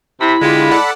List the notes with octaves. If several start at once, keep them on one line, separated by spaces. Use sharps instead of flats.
C3 E4 B5
D3 G#3 F4 G4
A4 D5 F#5